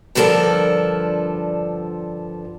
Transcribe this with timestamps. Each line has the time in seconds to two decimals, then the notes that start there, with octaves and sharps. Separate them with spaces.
0.15 G2 D3 F3 A4 A#4 D5